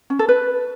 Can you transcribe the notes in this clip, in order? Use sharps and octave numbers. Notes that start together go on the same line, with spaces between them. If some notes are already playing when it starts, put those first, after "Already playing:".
C#4
A4
B4